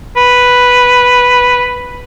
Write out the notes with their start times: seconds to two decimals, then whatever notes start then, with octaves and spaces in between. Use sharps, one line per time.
0.17 B4